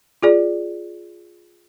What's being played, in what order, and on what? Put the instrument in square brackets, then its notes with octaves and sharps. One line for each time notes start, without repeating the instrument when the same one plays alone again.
[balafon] F4 G#4 D5